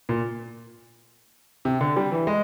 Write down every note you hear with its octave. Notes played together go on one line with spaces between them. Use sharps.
A#2
C3
D3
G3
E3
G#3